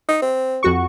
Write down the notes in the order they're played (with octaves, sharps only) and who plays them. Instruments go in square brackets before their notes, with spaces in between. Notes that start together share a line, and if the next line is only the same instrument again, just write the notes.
[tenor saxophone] D#4
C4
[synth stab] F2 F#4 C#6